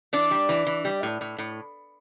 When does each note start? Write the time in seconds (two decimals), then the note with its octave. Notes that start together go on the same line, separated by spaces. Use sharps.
0.13 E3 D4 D5
0.31 G3
0.49 E3
0.67 E3
0.85 G3
1.03 A2
1.21 A2
1.38 A2